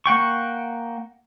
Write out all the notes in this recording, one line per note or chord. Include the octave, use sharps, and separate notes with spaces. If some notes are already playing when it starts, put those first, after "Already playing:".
A#3 F#5 G5 C#6